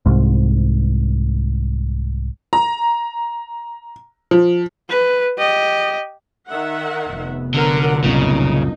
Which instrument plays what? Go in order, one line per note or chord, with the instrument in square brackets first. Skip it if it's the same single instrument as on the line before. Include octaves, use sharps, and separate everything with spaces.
[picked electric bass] C2 G#2
[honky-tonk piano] A#5
F3
[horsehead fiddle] B4
G4 D#5
[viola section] D#3 E5 F#5
[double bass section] F1 B3
[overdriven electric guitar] D3 [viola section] F#3 A#4 F#5
[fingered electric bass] C2 F#2 A#2 [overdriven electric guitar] C#3 [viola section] D#4